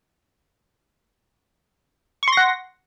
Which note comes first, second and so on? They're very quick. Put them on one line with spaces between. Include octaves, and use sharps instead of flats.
C#6 C6 A#6 F#5